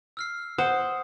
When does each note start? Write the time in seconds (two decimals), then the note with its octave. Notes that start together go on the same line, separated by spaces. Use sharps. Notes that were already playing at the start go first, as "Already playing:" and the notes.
0.17 E6 F6 C7
0.58 C5 F#5 D#6